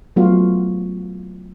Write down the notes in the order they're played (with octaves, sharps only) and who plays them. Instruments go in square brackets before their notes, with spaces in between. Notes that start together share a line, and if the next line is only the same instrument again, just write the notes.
[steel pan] F#3 A3 B3 F4 F#4